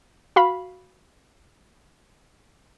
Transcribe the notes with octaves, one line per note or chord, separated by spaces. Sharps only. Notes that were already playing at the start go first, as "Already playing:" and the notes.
F#4 F5 B5